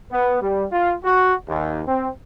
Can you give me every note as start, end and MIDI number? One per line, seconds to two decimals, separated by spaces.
0.11 0.38 59
0.41 0.65 55
0.71 0.93 65
1.04 1.33 66
1.48 1.81 39
1.86 2.09 60